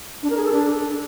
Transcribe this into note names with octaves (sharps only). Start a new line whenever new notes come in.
D4
A#4
G#4
A4
D4